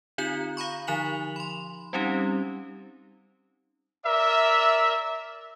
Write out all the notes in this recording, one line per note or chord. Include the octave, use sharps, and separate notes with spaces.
D3 C4 D#4 F4 G6
F5 A#5 B5 C#6
D3 F3 D#4 G#5 F7 F#7
B5 C6
G3 C4 C#4 D#4 G4
A#4 D5 E5